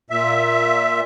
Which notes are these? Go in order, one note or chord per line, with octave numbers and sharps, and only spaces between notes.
A#2 E5